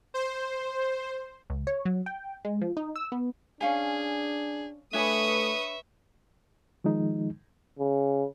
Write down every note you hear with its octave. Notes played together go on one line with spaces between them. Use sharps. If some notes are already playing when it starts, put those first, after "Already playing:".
C5
C#2
C#5
F#3
G5
G#3
F3
D#4
E6
B3
C#4 D4 G#4 F5 G#5
A3 D4 B4 C#5 E5 G#5 C#6 D#6
D#3 F3 G#3 D#4
C#3